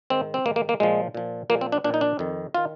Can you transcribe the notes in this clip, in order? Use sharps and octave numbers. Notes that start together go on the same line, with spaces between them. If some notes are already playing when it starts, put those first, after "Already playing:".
G#2 D#3 C4
C4
G#2 D#3 A#3
A#3
A#3
A#2 F3 G#3
A#2 F3
A#2 F3 A#3
C4
D4
A#2 F3 D4
D#4
D4
F2 D#3
D#3 F4